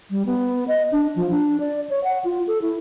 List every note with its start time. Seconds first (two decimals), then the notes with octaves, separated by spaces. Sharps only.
0.10 G3
0.26 B3
0.68 D#5
0.92 D4
1.16 F3
1.31 D4
1.60 D5
1.89 C#5
2.04 F#5
2.24 F4
2.47 A4
2.62 E4